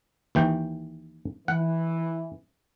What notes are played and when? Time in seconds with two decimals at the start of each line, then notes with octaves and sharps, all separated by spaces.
0.35 D#2 E3 G5
1.48 E3 F#5